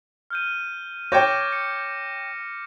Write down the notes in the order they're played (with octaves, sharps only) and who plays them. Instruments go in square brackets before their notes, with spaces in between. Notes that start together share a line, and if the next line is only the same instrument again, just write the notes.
[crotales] F6 G6 D#7
[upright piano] C#5 G5 [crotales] D6 G6 A#6
[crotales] C#7